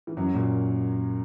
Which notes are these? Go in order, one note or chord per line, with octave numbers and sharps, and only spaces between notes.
E3
F#2 F#3
A#2 A#3